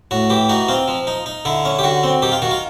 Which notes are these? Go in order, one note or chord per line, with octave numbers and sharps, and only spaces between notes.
A2 F#4
E3 G4
D#4 F#4
C4 F4
F3
D#4
D#4
D3 E4
C#4
G4
D3 F#4
C4
D#3 G4
F4
D#3 F#4
F4